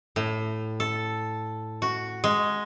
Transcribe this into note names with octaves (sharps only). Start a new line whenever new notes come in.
A2
A4
F#4
G#3